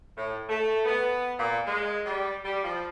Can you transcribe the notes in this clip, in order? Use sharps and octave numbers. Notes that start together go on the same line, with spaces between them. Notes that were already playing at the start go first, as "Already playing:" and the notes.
A2
A3
B3
A#2
G#3
G3
G3
F3